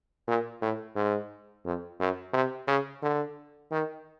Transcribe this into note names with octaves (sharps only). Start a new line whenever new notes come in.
A#2
A2
G#2
F2
F#2
C3
C#3
D3
D#3